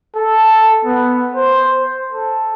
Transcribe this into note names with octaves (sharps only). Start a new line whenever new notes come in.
A4
B3
C5
A4